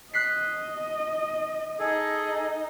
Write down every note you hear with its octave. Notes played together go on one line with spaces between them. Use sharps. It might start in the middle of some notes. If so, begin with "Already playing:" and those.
D#5 F#6 B6 C7
D#4 G#4 A4